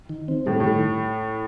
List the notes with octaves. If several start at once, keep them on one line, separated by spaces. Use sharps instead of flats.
D#3
C4
A2 G3
A2
D#3